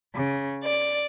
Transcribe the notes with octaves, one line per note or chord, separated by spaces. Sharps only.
C#3
D5